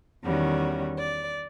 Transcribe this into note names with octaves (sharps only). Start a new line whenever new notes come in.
E2 D#3 G3 C#4 F#4
D5